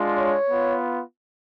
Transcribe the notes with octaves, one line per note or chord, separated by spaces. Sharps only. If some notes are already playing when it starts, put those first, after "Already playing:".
Already playing: G#3 D4 F4
C#5
B3 F4